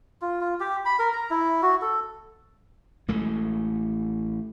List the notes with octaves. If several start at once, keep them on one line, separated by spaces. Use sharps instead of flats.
F4
F4
G4
B5
A#4
A#5
E4
F#4
A4
A1 G#3 A3